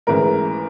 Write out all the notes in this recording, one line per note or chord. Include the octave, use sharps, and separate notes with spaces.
A1 G#2 E3 A#4